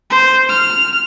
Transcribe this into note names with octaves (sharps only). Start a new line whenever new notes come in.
C5
F6